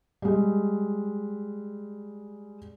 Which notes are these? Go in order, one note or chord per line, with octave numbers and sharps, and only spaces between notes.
G3 G#3